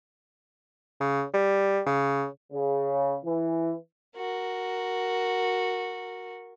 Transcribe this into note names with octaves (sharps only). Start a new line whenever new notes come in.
C#3
G3
C#3
C#3
E3
F#4 A#4